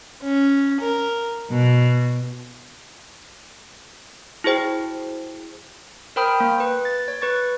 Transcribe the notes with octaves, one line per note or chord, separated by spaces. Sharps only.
C#4
A#4
B2
E4 F#4 G#4 C5 G5
A#4 C5 G5 B5 D#6 F6
A#3
B4
A6
C#5
B4 C#6 A6